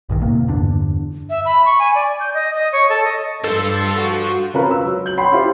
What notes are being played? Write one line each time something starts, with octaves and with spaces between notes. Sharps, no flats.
A#1 G2 D#3
D#1 A2 C3 A#3
E2 G2 D3 D4
E5
B5
C#6
G#5
D5
G6
D#5
D#5
C#5
A4
D#5
G2 F4 A4 C5
F#4
C#3 C4 F4 A#4 B4
E6
F#3
G6 F#7
C#5 F#5 G5 B5 C6 C7
E4 F4 G4 C5